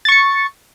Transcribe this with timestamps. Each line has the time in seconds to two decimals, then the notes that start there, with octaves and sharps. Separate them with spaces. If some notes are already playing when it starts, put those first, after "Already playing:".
0.05 A6
0.09 C#6
0.12 C#7